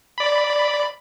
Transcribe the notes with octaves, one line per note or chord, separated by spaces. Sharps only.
D5 B5